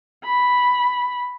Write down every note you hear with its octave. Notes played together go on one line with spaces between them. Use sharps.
B5